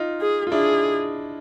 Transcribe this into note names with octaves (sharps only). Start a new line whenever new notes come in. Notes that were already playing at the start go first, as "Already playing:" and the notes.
Already playing: D#4 F4
G#4
F4
D4 E4 G#4